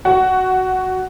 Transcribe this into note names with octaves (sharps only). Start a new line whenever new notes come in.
F#4